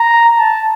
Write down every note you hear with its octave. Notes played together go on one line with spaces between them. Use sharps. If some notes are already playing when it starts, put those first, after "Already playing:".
Already playing: A#5
A5